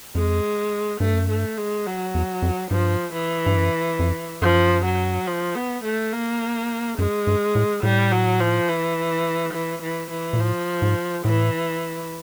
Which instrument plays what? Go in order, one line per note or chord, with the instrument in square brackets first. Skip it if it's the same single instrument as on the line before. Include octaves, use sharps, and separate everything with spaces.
[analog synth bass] F2 [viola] G#3
[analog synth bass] G2 [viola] A3
[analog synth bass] F#2
[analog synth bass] G2 [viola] A3
[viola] G#3
F#3
[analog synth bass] E2
F2
[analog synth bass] G2 [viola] F3
[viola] E3
[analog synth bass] G2
F#2
F2
[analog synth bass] F#2 [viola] F3
[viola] F#3
F3
B3
A3
A#3
[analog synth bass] F#2 [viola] G#3
[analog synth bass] G2
A2
[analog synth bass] A2 [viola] G3
[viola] F#3
F3
E3
E3
E3
E3
[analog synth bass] A#2
[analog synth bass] A2 [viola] F3
[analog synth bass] G#2
[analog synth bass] A2 [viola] E3